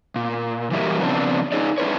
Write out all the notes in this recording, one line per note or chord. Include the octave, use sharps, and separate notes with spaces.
A#2
E3 F#3 G3 E4 G4 A#4
C#3 F3 B3 C4 D4 C5
D#4 G#4 C#5 D5
D4 E4 B4 C#5